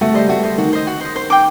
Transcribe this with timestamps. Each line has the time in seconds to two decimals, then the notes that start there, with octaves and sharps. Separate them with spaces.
0.01 A3 F#4
0.14 G3 C5 D#5
0.28 A3 F#4
0.43 C5 D#5
0.58 D#3 F#4
0.73 C5 D#5
0.87 F#4
1.01 C5 D#5
1.16 C5
1.30 G5 D6